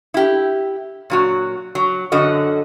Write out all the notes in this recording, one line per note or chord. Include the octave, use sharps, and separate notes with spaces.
E4 G4
A#2 F#3 F#4
F#3
F#2 D3 F#4 D#5